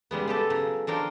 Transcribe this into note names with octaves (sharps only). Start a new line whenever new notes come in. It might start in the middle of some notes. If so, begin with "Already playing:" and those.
C#3 G3 G#3 B3
B3 G4 A4
C#3 F#3
F3 D4 A#4 G5